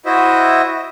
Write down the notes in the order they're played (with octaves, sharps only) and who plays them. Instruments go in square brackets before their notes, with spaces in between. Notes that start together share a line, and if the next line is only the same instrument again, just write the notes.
[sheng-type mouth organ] E4 F#4 C5 D#5 E5